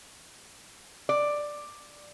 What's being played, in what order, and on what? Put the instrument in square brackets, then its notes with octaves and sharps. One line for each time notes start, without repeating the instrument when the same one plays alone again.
[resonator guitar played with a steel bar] D5